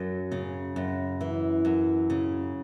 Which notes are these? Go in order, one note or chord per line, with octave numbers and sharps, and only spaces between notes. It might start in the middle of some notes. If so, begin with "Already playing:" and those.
Already playing: F#2 F#3
C#3
F#2
E3
F#2
C#3